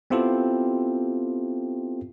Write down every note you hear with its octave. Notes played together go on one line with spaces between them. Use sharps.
B3 C4 E4 F4 G4 A4